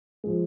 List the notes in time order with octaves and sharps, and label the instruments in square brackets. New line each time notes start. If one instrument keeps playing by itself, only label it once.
[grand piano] F3 G#3